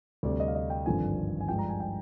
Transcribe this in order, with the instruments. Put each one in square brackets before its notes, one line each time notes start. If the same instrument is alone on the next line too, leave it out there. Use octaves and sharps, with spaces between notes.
[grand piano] D2 C3 G3 D5
D#5
F5
D#5
G5
G#1 G2 D3 F3 C4 G#5
G#5
G2 F3 G#3 D4 G5
A#5
G#5
G5